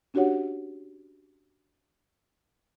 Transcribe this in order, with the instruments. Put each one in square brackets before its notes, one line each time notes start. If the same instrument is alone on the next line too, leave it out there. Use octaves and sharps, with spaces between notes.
[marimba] C#4 D4 F#4 G4 C#5 F#5